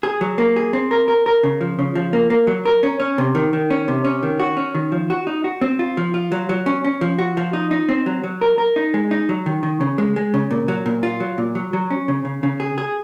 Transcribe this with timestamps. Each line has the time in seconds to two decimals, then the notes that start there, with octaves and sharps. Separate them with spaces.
0.03 G#4
0.21 F#3
0.38 A#3
0.56 G#4
0.73 C4
0.91 A#4
1.08 A#4
1.26 A#4
1.43 C#3
1.61 F3
1.79 C#3
1.95 F3
2.13 A#3
2.30 A#3
2.47 F#3
2.65 A#4
2.83 C#4
3.00 C#4
3.18 C3
3.35 D#3
3.53 D#3
3.70 C#4
3.88 C3
4.04 C#4
4.23 D#3
4.40 F#4
4.57 C#4
4.75 D#3
4.92 F3
5.10 F#4
5.27 D#4
5.44 F#4
5.61 C4
5.79 F4
5.97 F3
6.14 F4
6.32 F#3
6.49 F#3
6.66 C#4
6.84 C#4
7.01 F3
7.18 F#4
7.37 F3
7.53 D#4
7.71 D#4
7.89 C4
8.06 F#3
8.24 F#3
8.41 A#4
8.58 A#4
8.76 D#4
8.94 G#3
9.11 D#4
9.29 F#3
9.46 D#3
9.63 D#3
9.81 C#3
9.98 G#3
10.16 G#3
10.34 C#3
10.51 A#2
10.68 F#3
10.86 A#2
11.03 F4
11.20 F#3
11.38 A#2
11.55 F#3
11.73 F#3
11.90 C#4
12.08 C#3
12.25 C#3
12.43 C#3
12.60 G#4
12.78 G#4